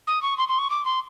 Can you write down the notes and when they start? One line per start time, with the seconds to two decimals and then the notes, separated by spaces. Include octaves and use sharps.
0.07 D#6
0.22 C#6
0.38 C6
0.48 C6
0.58 C#6
0.70 D6
0.85 C6